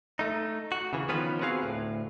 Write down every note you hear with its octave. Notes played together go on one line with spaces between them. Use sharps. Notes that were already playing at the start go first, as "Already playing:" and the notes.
A3 D#4
F#4
C#3 E3
D#3 F3 B3 C#4 F4 B4
B3 C4 F#4 G#4 F5
D2 A2